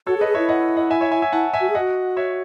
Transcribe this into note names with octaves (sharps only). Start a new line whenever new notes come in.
F#4 A4 C#5
G#4
B4 D#5
G#4
E4 C#5 E5
D#5 F#5
D#5 F#5
E5 G#5
C#5 E5
E5 G#5
E5 G#5
E4 F#5 A5
E5 G#5
F#4
G#4
F#4 D#5 F#5
C#5 E5